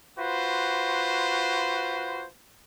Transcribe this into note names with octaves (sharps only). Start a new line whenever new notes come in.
F4 F#4 B4 C5